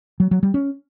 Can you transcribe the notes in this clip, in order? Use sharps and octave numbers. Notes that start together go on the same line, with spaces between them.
F#3
F#3
G3
C#4